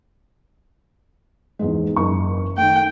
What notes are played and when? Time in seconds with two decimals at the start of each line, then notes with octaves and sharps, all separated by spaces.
1.59 E2 G#2 G#3
1.96 F#1 C#6
2.57 D#3 A3 G5